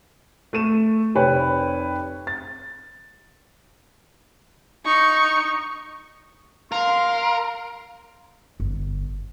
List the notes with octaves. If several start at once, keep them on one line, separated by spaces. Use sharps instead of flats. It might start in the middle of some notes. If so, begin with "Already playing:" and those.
A3 A4 D#7 E7
F1 C3 B4 C#5 G5 B5
A6
D#4 C#6
A#4 F5 C6
G1